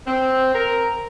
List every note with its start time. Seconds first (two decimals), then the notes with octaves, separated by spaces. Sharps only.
0.07 C4
0.54 A#4